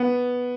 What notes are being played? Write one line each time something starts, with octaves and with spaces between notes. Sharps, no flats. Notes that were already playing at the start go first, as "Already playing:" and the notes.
Already playing: B3